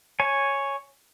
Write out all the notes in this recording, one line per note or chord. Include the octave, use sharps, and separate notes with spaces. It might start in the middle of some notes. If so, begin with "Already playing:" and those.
C#5 G#5